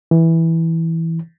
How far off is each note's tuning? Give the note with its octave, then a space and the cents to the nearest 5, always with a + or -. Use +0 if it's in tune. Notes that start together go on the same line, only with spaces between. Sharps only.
E3 -10